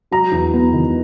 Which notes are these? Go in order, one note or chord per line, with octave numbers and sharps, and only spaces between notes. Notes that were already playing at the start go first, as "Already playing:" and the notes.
F#3 A#5
E2
B3
D#3